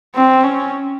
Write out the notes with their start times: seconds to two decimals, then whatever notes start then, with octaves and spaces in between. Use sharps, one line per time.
0.15 C4
0.44 C#4